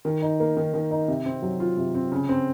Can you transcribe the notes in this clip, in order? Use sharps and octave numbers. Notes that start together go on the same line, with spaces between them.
D#3
D#4
A#3
D#3
D#3
D#4
C3
C4
F#3
F4
C3
C4
C#3
C4